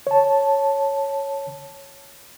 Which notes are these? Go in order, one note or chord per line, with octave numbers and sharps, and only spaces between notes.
C#5 A5